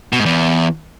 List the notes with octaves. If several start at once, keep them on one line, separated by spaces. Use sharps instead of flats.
B2
G#2
E2